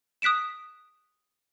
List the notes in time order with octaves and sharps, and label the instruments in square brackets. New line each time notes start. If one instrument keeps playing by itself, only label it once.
[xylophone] D#6 F#6 B6 D7 E7